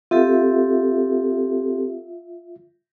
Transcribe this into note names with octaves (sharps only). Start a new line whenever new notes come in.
C4 F4 G4 A4 E5